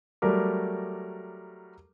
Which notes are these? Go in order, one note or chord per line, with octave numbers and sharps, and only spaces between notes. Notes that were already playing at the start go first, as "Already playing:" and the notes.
F#3 G3 A3 A#4 D6